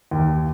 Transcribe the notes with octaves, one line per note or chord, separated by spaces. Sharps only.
D#2